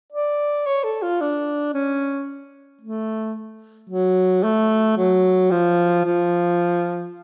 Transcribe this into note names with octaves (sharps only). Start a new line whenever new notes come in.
D5
C#5
A4
F4
D4
C#4
A3
F#3
A3
F#3
F3
F3